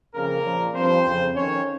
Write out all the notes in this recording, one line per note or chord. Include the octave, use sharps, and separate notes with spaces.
F2 C#3 F3 A#3 A#4
A#2 F3
G2 F3 C4 C5
F2 C#3 F3
F2 D#3 C#4 C#5